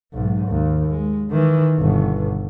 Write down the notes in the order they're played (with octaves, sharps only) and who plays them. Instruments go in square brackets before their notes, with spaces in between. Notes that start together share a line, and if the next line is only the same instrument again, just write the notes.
[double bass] B1 G#2
D#2
G#3
D#3 E3
G1 B2